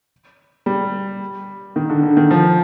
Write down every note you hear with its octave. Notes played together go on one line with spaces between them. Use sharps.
G3
D#3
D3
D3
D#3
F3